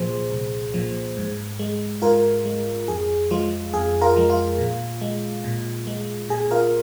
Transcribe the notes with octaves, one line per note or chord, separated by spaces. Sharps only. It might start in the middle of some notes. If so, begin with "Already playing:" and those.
Already playing: C2 A#2 F3 G#4 C5
C2
A#2 F3
G#2
G#3
G#2 F4 A#4
G#3
F2 G#4
F3 G#3 F4
F2 G#4
F4 A#4
F3 G#3
F4
A#2
G#3
A#2
G#3
A#2 G#4
F4 A#4